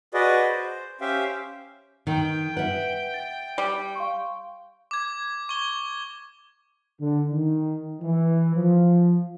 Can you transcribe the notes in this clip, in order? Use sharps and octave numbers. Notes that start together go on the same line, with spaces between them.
F#4 G#4 B4 D5 D#5
C5
C#4 G4 C5 E5 F5 G5
D#3 G5
B4 E5 F#5
A6
G3
F5 C6 C#6
D6 G#6
C#6 G7
D3
D#3
E3
F3